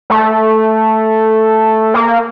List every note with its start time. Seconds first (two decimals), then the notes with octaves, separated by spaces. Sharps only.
0.10 A3
1.94 A#3